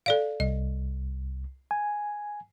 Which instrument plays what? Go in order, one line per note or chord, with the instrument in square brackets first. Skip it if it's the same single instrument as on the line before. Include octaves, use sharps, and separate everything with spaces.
[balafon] A4 D5 F5
[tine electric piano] C2 [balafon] D#5
[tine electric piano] G#5